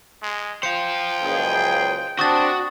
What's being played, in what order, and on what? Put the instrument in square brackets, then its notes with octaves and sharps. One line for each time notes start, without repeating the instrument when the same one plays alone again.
[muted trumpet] G#3
[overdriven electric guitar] C5 F5 [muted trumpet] G5 [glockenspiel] C#7
[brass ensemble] F#1 C#2 G#4
[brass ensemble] C4 D4 [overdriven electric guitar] F#4 [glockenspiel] C#6 D#6 A6